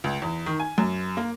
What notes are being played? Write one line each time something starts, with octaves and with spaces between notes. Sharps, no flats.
C#2
E2
D#3
G#5
F#2
A#3